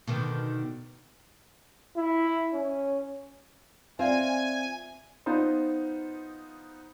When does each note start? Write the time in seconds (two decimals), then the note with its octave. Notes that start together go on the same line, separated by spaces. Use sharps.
0.07 B2 D3 D#3
1.97 E4
2.54 C#4
3.99 C4 F4 D5 E5 G#5
5.26 B3 D#4 F4 C5